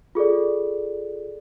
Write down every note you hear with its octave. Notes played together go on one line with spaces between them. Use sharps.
F4 G#4 A4 D5